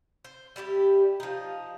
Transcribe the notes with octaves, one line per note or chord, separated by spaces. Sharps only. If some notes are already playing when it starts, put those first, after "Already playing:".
C5
G3 E4 F#4 G4
F3 D#4